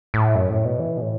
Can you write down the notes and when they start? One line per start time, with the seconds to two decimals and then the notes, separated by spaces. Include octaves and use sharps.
0.14 A2
0.35 F#2
0.50 A2
0.65 B2
0.79 E3
0.97 B2
1.01 A2